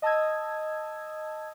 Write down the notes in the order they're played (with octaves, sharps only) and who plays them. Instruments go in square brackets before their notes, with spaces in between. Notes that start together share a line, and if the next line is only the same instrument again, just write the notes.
[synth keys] D#5 A5 D#6 E6 G#6